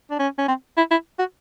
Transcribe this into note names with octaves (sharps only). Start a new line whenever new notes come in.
D4
C#4
C#4
C4
E4
E4
F#4